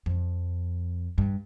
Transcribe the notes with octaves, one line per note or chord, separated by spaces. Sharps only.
F2
G2